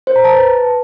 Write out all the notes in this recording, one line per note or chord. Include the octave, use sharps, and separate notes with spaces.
C5
A#5
A5
B4